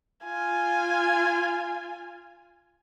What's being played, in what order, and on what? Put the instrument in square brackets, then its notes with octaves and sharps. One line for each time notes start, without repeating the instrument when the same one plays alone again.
[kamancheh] F4 G#5